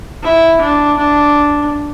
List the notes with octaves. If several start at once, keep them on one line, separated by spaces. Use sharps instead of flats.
E4
D4
D4